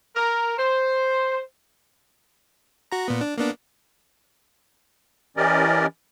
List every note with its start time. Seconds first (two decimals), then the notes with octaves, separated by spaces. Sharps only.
0.16 A#4
0.58 C5
2.92 F#4 A#5
3.08 A#2 B3
3.21 D4
3.38 A#3 B3 D4
5.37 E3 C#4 G4 A#4 D5 D#5